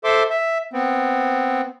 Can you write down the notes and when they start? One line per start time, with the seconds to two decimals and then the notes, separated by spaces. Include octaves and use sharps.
0.04 A4 C5 E5 C6 D6
0.30 E5
0.73 B3 C4